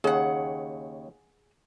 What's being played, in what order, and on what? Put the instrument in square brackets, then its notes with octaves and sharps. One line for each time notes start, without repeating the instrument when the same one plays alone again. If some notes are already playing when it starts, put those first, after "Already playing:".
[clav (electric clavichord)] D#2 C#3 [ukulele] G#4 F#5